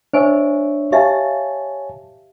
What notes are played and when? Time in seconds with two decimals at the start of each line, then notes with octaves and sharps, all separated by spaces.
0.14 D4 C5 C#5 E5 G#5
0.92 G4 C#5 E5 F5 G#5 A5